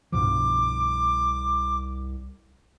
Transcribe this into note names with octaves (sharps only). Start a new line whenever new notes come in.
C2 G2 B2 F3 D6